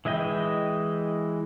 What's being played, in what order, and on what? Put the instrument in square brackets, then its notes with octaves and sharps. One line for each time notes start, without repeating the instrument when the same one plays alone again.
[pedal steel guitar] E3 G#3 E4 D#5 G5